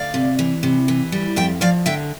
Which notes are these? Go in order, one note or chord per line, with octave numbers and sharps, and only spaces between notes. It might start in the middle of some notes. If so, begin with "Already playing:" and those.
Already playing: D2 D5 F5
C3
E3
C3
E3
G3
F2 E5 G5
F3 D5 F5
D3 E5 G5